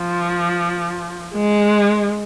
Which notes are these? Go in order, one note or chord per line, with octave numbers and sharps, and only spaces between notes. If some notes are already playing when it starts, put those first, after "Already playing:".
Already playing: F3
G#3